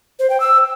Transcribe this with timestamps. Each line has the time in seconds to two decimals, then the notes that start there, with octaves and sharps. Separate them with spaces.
0.19 C5
0.30 G5
0.40 E6